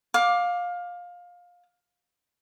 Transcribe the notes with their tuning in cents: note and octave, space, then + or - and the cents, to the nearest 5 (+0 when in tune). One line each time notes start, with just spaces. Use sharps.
F5 +20 D6 +0